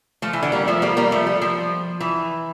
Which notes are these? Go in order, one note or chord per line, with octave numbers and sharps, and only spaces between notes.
F3 A3
E3
D3
G3 A#3
F3 A3
G3 A#3
G3 A#3
F3 A3
G3
F3
E3